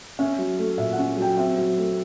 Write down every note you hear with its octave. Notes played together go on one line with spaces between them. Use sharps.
C#4 E5
F#3
A3
A#2 E5
F#5
C#4
F#3 G5
C4 E5
F#3
A3